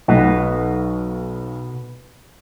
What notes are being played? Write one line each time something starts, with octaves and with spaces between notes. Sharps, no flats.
B1 B2 B4 F#5